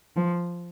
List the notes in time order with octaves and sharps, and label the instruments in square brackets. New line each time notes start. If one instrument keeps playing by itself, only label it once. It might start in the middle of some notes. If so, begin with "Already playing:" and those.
[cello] F3